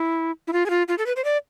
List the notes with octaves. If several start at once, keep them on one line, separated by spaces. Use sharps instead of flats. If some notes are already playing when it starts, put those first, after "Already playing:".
Already playing: E4
E4
F4
G#4
F4
F4
A4
B4
C5
D5